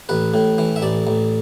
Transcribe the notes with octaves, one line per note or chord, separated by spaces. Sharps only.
A1 B4
A2
E3
E5
A1 D5
A1